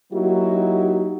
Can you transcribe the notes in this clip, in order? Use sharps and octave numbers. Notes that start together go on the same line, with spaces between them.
F#3 A#3 D#4 E4 F#4 G4